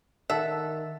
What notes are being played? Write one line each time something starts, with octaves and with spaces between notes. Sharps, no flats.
D#3 A4 E5 F#5